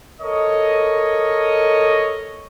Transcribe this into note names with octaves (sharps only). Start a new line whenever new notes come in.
A4 A#4 C#5 D#5